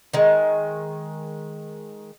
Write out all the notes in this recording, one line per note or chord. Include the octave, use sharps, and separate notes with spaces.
D#3 G#3